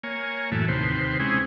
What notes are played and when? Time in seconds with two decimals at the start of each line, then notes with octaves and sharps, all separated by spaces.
0.03 A#3 C#5 G#5
0.52 F#2 A2 E3 A3
0.68 D#2 C3 B4 C5
1.20 G#3 C4 C#4 E4 G#4